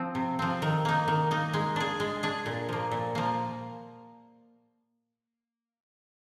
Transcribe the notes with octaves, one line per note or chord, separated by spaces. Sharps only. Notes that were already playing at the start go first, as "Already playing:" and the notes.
Already playing: F3 C4
C3
F3 C4
D#3
A#3 D#4
D#3
A#3 D#4
G#3
D4 G#4
G#3
D4 G#4
A#2
F3 A#3
A#2
F3 A#3